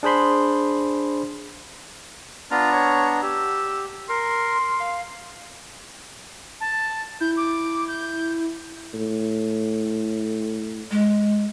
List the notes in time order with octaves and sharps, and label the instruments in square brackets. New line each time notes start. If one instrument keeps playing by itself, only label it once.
[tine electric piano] D4 G#4 C5 B5 C6
[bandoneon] B3 D4 A#5 [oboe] F4
[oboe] C#5
[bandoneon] G4 [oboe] E6
[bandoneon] A#4 [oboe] C6
[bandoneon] F5
[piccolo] A5
[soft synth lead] E4 [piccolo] G6
[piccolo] D6
G6
[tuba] A2
[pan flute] G#3